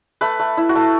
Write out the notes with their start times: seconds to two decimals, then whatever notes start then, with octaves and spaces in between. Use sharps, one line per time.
0.21 A3 B4
0.39 A3
0.57 E4
0.69 F#4
0.75 A3